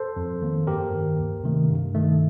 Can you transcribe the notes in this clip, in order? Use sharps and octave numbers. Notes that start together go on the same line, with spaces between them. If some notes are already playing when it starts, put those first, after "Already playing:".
Already playing: A4 C5
F2
D#3 A#3
G2 G4 A#4
D#3 A#3
D2
C3 D#3 A3
G2
D#3 A3